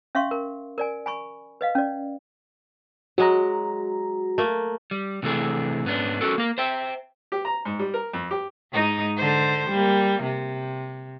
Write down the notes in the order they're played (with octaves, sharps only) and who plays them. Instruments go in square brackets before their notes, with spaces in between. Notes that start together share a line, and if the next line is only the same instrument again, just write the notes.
[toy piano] C#4 E5 F5 C6 C#6
A#4
A#4 D5 G#5
G#5 B5 C#6
B4 D#5 F5
C#4 D5
[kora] F#3 G#3 [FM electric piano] F#4 A#5
[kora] A3 A#3
[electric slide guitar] G3
C3 E3 A3 G#4
G#2 B3 C#4 D4
C#4 F#4 A4 A#4
A#3 A#4
C5 E5 G5
[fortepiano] G4
A#5
G#2
G3
A#4
F2
G4
[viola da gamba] G#2 D#4 D#5
D3 C5
G3 A#3
C3